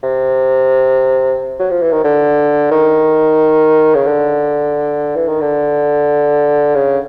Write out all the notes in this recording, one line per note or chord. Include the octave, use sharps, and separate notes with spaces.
C3
F#3
F3
E3
D#3
D3
D#3
C#3
D3
E3
D#3
D3
C#3